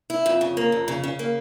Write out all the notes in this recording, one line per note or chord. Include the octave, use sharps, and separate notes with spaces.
E4
F2
C#3
A#3
F2
C#3
C#3
A#3